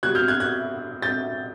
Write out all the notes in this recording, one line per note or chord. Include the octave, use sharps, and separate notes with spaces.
B2 G3 F#6 G#6
F6 G6
F#6 G#6
F#6 G#6
G6 A6